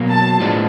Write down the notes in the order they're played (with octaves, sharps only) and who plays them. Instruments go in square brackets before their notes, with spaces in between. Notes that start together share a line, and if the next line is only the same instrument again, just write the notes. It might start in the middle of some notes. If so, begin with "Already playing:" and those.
Already playing: [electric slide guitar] B2 F#3 A#3
[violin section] A5
[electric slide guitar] A2 F3 G#3 B3 D4